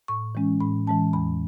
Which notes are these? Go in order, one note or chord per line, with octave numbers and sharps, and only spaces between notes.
A2 C#6
E3 G#3 C#4
A2 B5
E3 G#3 C#4 A5
E2 B5